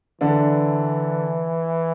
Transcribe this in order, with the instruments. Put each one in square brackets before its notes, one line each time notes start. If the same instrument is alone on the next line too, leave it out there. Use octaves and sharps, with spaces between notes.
[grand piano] D3 D4 [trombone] E3